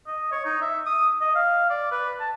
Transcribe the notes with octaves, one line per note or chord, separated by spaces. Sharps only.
D#5
C#5
D#4
E5
D#6
D#5
F5
D5
B4
A5